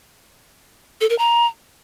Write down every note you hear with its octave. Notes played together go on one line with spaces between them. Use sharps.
A4
A#4
A#5